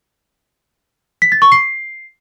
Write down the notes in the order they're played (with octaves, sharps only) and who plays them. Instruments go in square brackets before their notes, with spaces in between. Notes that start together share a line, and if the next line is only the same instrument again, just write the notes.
[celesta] B6
A6
C#6
C7